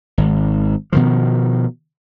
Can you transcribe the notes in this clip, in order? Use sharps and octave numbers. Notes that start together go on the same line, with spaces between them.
G#1
B2 D#3 F3